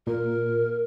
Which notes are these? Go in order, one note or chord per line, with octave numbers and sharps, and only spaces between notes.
A#2 A#4